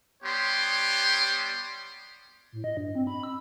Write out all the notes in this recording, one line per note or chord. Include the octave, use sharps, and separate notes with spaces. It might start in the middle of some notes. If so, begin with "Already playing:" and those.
G3 B3 G4 C#5 C6
A2
D#5
G2
C4
B5
E6